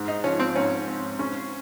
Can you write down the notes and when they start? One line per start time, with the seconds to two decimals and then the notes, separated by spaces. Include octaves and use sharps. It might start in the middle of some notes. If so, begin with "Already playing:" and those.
Already playing: G#2
0.08 D#4
0.24 F3 C#4
0.39 C4
0.55 G#2 C#4
0.87 C4
1.19 C#4